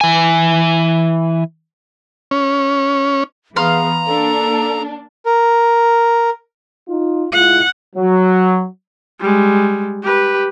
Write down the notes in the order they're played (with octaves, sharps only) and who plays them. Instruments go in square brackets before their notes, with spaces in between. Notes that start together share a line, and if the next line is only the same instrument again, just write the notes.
[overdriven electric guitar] E3 G#5
[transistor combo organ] C#4
[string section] E3 B3 [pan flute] G#4 [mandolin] F5 C6 [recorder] A#5
[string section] A#3 D4 [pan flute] A4
[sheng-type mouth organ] A#4
[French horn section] D#4 F4
[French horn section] G#3 E4 F4 [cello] F#5
[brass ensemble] F#3
[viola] G3 G#3
G4 B4